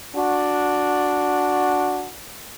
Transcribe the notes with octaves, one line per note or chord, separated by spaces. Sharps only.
D4 F#4